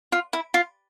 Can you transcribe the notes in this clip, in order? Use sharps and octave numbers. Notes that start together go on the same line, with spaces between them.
F4
E4
F4